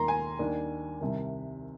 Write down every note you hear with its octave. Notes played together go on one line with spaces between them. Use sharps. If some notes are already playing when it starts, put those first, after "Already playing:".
Already playing: D#2 D#3 A#3 A#5 C6
G#5
D#2 D#3 A#3 D4
C2 C3 D#3